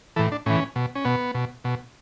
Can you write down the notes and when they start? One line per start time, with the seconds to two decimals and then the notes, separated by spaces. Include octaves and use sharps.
0.16 A2 E3 A4
0.32 D4
0.46 A2 E3 C#4
0.76 B2
0.95 C#4
1.05 B2 B3
1.35 B2
1.65 B2